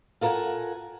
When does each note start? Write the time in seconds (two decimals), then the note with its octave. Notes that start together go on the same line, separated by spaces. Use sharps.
0.21 F4 A4 A#4 F5 F#5 G#5